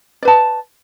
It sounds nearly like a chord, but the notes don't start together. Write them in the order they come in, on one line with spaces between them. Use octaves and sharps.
D5 B4 A5